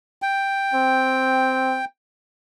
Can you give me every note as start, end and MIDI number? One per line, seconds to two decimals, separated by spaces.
0.22 1.85 79
0.74 1.81 60